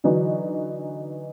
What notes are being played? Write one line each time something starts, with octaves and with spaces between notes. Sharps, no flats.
D3 E3 F#3 D#4 F#4